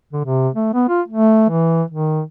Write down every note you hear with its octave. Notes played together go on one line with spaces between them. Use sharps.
D3
C3
A3
B3
F4
A3
E3
D#3